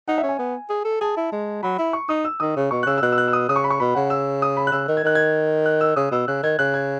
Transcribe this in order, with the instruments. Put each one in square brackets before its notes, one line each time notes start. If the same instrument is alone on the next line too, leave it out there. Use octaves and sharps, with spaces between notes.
[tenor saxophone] D#4 [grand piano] F#5
[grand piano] E5
[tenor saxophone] C#4
[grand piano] G#5
[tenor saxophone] B3
G#4
A4
[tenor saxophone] G#4 [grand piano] A5
[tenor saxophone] E4
G#3
[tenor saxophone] F#3 [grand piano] B5
[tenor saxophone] E4
[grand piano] C#6
[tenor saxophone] D#4 [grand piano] D#6
[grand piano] E6
[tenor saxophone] D#3 [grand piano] D#6
[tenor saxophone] C#3
[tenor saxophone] B2 [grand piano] C#6
[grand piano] F#6
[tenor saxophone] C#3 [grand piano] E6
[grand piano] E6
[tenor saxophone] B2 [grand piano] F#6
[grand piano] E6
F#6
E6
D#6
[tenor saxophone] C#3 [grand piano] D#6
[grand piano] C#6
B5
C#6
[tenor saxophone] B2 [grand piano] B5
[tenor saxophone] C#3 [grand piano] F#5
[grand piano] E6
D#6
B5
F#6
[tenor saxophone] C#3 [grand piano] E6
[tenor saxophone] D#3
[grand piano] G#6
[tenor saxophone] D#3 [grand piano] F#6
[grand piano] G#6
F#6
E6
[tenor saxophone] C#3 [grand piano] D#6
[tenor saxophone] B2 [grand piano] E6
[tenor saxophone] C#3 [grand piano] F#6
[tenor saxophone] D#3 [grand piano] G#6
[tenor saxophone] C#3 [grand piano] F#6
[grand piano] G#6